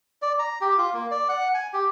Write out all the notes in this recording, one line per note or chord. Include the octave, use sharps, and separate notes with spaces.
D5
A#5
G4
F4
A#3
D5
F#5
G#5
G4